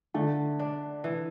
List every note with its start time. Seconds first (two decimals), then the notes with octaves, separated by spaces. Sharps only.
0.14 D3 A3
0.59 D4
1.04 E3